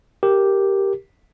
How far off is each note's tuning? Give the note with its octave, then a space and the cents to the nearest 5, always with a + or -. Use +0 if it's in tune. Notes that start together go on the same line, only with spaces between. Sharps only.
G4 +0 A#4 +0